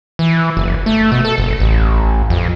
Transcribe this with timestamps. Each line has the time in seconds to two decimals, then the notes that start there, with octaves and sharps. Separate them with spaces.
0.19 E3
0.57 F#1
0.86 A3
1.12 B2
1.25 A4
1.38 F#1
1.60 A1
2.30 F2